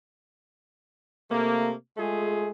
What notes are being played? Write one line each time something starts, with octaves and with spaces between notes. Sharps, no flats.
C3 A3 A#3
G#3 A3 F4 G#4